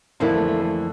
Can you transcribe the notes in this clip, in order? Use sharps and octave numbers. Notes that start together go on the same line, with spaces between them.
F2 D3 E3 A#3 E4
A3
A3
A3